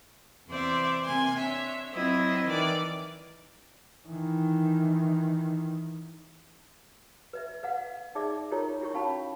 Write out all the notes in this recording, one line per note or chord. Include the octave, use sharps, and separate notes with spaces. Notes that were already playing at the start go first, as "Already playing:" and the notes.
E2 C3 C5 D5 E5
C3 A#3 G#5 C6
D4 C#5 E5
F#3 C4 E4 C5 D#5
D#3 E3 D5
D#3 E3
B4 D#5 E5
B4 D#5 F5 F#5
D#4 G#4 D5 E5 D6
D#4 F4 G4 A#4 C#5 A#5
E4 F#4 G4 C#5 C#6
C#4 G4 F5 A5 B5